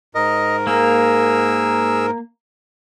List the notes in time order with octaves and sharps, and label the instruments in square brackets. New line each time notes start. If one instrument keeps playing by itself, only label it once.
[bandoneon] G#2 A#4 [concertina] D#5
[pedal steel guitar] A#3 [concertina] G#4 E6